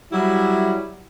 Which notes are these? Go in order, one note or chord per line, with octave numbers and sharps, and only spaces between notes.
F#3 G3 E4